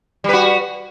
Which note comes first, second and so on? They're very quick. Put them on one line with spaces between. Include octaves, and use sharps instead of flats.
G3 B4 F#4